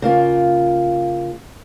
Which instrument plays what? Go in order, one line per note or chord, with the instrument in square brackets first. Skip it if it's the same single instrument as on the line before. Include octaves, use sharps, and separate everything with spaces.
[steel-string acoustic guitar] C#3 A#3 F4